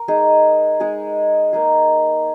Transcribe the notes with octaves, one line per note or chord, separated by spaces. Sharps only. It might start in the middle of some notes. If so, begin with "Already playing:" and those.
Already playing: A#4
G#3 D#4 G#4
G#3 D#4 G#4
A#3 D#4 G#4